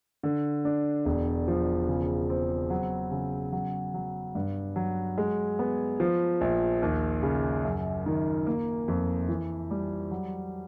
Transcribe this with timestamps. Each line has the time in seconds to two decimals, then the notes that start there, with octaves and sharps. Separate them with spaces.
0.23 D3
0.65 D4
1.05 E1
1.48 F3
1.88 C#3
2.30 C4
2.70 F#3
3.11 C#3
3.52 F#3
3.94 F#3
4.35 G2
4.76 F#3
5.18 G#3
5.59 B3
6.00 F3
6.41 A#1
6.82 D#2
7.23 C#3
7.65 F#2
8.06 D#3
8.47 A#3
8.88 F2
9.28 E3
9.71 G3
10.11 F#3